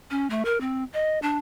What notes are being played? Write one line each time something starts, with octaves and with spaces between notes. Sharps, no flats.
C#4
A3
A#4
C4
D#5
D4